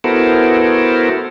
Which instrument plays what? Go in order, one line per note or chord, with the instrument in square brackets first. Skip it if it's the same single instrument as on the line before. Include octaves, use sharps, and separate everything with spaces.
[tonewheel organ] B3 E4 F#4 A4 A#4 C5